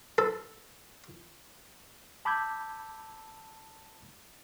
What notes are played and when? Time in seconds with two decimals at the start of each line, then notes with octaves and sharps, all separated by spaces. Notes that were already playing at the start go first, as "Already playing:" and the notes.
0.18 A4
2.25 A5 B5 D6 E6 G6 G#6